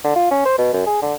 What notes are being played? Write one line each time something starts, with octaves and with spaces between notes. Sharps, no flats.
D3
F4
C#4
C5
B2
F#2
G#4
D3